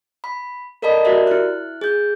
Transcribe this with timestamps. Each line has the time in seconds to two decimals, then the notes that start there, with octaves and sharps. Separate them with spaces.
0.24 B5
0.82 A4 A#4 D5 D#5 A5 B5
1.05 F#4 G4 A#4 D5 E5
1.27 E4 F#6
1.81 G#4 G6